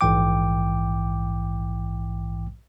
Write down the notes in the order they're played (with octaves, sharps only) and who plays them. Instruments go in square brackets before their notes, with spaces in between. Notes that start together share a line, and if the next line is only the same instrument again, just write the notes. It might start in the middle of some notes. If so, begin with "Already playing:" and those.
[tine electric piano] A#1 G#2 E3 G5 D6